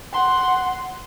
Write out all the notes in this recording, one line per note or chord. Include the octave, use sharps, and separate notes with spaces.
F#5 C6